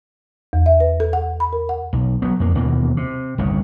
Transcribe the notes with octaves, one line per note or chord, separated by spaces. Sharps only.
E2
E5
B4
A4
F#5
B5
A#4
F#5
B1
F#3 B3
F2 A#3
D#2 B2 E3 A#3
C3
G1 C2 C#3